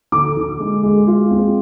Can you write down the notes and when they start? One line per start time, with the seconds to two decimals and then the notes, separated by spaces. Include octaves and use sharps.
0.12 D3 D6
0.37 D3
0.60 G#3
0.83 G#3
1.07 F4
1.31 C4